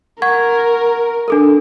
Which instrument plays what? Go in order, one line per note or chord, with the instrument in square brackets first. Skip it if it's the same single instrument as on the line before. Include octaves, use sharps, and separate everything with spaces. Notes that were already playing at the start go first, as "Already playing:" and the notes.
[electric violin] A#4 [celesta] F#5 C#6 G#6
[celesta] D4 A4 A#4